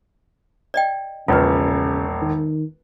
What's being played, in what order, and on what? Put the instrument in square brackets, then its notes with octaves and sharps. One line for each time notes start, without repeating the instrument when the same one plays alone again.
[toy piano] D5 D#5 G5
[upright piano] E1 A#1 [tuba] C#3 [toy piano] F4 B4
[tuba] D#3